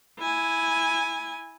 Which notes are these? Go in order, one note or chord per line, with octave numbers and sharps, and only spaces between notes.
E4 G#5